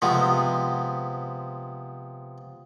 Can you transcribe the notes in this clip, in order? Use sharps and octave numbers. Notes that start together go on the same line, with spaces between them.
C3 F3 G#3 B3